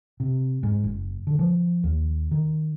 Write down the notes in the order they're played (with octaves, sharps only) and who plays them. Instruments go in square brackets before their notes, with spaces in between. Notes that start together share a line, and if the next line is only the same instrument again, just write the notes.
[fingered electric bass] C3
G#2
F#1
D3
F3
D#2
D#3